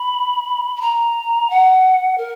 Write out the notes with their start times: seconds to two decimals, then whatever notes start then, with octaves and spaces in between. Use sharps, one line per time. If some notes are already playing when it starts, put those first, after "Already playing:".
Already playing: B5
0.76 B5
0.81 A#5
1.50 F#5
2.18 A#4